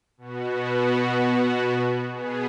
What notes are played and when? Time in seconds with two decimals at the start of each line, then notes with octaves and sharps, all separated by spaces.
0.18 B2 B3 F#4
2.12 B2 B3 G#4